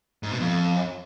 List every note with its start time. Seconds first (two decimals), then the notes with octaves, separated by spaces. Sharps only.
0.23 G#2
0.31 B2
0.40 F2